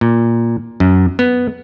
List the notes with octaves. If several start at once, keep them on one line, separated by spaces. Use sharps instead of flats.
A#2
F#2
B3